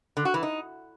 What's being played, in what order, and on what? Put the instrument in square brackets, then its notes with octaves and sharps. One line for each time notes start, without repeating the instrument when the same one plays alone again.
[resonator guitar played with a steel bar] D3
F#4
E3
D#4